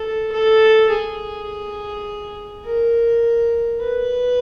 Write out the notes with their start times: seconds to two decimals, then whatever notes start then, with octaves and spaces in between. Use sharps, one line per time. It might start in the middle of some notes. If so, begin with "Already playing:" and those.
Already playing: A4
0.32 A4
0.90 G#4
2.65 A#4
3.80 B4